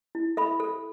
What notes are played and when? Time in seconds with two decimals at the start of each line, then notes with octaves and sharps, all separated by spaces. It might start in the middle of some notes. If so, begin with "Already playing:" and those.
0.15 E4
0.37 A4 E5 B5
0.60 A4